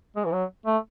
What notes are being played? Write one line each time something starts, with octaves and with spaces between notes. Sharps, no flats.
G#3
E3
F#3
A3